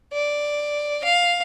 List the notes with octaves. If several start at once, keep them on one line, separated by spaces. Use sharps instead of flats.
D5
F5